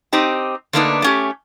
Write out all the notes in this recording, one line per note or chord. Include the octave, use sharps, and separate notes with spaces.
C4 D#4 G4
D3 A3 A#3 D4 D#4 B4
A3 C#4 G4